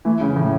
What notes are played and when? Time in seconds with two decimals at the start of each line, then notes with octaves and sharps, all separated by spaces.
0.05 E3 A3
0.21 C#3
0.36 A2 E3